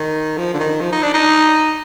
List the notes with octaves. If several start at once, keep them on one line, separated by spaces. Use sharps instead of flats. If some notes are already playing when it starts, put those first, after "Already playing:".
Already playing: D#3
F3
D3
D#3
F3
D#4
D4
D#4